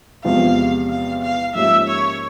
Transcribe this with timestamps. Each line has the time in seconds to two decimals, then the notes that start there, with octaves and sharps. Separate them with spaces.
0.24 E2 C3 F3 G#3 F5
0.90 F5
1.23 F5
1.55 G#2 F3 A#3 C#4 G4 E5
1.88 C#5